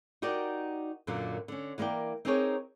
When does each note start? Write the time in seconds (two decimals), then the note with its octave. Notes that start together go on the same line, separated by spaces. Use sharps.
0.22 D#4 F#4 G4 A#4 D5
1.07 F#2 A#2 D3 F#3 A#3
1.48 D3 C#4
1.78 E3 A#3 A#4 D5 G5
2.25 C4 D#4 G4 G#4 A#4 C#5